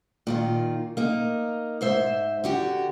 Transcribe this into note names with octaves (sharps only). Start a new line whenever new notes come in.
A#2 D#3 F4
A#3 D#4
G#2 C5 E5
D3 F#4 G4